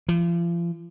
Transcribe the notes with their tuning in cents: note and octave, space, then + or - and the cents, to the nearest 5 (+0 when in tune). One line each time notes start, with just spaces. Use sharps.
F3 -40